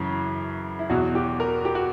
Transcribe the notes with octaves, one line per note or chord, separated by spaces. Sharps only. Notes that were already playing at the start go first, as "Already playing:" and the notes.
Already playing: F#2 C#3 E3
E4
E2 B2 F#3 F#4
G4
A#4
G4
F#4